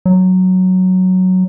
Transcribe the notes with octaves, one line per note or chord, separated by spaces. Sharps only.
F#3